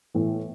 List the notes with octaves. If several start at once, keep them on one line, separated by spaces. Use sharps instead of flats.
A2 E3